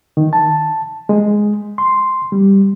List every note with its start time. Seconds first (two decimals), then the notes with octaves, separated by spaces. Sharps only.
0.17 D#3
0.33 A5
1.09 G#3
1.78 C6
2.32 G3